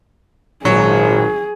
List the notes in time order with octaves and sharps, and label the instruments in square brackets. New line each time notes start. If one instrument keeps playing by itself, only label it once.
[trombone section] G#1 [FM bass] A#2 [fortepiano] F#3 [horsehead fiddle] G#4